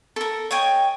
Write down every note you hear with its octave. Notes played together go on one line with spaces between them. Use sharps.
A4 A#4
C#5 D#5 G5 G#5